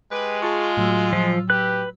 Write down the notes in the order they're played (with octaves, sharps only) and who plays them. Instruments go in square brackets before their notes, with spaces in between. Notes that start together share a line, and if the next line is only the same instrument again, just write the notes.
[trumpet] G#3 [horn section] G4 B4
[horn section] F4 [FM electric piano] G#4 A5 C#6
[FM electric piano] A2 F#3 E6
[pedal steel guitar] F3
[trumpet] G4 [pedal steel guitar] B4 F#6